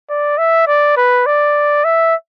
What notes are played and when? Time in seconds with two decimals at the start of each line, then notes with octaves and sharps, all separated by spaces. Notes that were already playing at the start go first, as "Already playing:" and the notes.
0.10 D5
0.38 E5
0.68 D5
0.97 B4
1.26 D5
1.84 E5